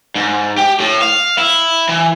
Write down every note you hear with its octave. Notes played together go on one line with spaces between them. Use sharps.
G#2
G4
A2
F5
E4
E3